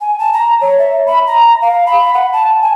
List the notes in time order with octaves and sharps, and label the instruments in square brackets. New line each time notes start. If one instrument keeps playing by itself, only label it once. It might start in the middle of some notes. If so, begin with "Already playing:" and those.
[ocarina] G#5
A5
A#5
C#5
E5
B5
A#5
F5
B5
F#5
A5
G#5